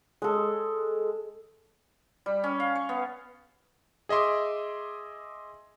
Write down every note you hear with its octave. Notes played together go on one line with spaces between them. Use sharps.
G#3 A4
G3
C#4
F5
C#5
B3
G#4 D#5 E5 C6 D6